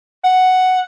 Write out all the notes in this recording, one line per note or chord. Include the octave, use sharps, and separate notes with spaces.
F#5